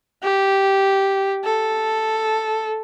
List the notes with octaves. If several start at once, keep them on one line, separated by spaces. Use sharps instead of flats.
G4
A4